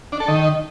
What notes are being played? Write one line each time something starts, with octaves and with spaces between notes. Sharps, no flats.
D4
A4
D#3